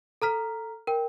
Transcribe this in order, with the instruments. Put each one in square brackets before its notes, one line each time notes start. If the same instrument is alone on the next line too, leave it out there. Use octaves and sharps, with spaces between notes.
[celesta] A4 A#5 F6 B6
A#4 G5